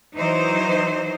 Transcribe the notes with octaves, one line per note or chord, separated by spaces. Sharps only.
E3 F#3 D#4 C5